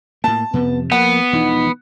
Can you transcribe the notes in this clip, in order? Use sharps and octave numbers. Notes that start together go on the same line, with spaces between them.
A2 A#3 A5
F2 C3 F3 B3
F3 A#3 B3 F#5
E1 E3 F3 D#4